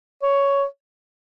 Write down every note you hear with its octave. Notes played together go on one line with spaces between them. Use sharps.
C#5